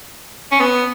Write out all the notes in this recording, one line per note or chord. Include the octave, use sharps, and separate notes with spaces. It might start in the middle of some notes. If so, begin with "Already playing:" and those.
C#4
B3